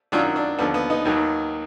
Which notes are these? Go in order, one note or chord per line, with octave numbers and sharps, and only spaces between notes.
F#2 D#3 F#3 D4 F4
D4
D#2 D3 F3 B3
B3
B3 D#4
D#2 D#3 F#3